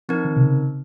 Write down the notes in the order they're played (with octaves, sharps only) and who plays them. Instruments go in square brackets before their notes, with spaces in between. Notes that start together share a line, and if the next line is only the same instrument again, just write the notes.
[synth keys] F3 [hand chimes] C4 D#4 A#4
[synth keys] D#3
C3
C#3